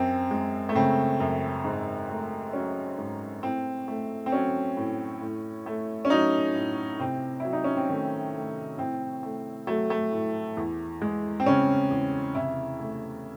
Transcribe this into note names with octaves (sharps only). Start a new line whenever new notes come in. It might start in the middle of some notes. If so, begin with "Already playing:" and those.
Already playing: F#2 C4
G#3
A3
C#3 C4
F#2
G#2
A3
F#3 C#4
G#2
A2 C4
A3
C4
F#3 C#4
A2
A2
A3
C#4
F#3 D#4
A2
C3 C4
F#3 E4
D#4
C#4
C4
D#3 A3
A3
A2 C4
A3
F#3 A3
A3
A2
E2
G#3
C4
C#3 C#4
E2
C3 E4
A3